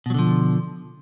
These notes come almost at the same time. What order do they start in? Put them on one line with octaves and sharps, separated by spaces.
B2 F#3 D3 F3